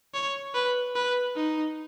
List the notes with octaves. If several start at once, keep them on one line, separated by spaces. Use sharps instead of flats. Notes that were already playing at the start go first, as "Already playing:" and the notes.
C#5
B4
B4
D#4